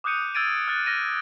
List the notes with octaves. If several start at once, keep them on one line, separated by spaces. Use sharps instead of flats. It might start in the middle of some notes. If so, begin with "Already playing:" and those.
D6 D#6 F#6 G6 C#7 D#7
E6 F6 G#6 A6 D7 D#7
F6 F#6 A6
F6 A#6 D#7